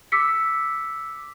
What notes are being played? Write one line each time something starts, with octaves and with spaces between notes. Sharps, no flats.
D6 E6 B6 C#7